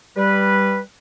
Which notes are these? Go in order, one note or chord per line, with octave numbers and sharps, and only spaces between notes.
G3 B4